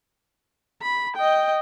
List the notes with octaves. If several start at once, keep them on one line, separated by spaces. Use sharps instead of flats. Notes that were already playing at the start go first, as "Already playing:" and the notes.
B5
D#5 G5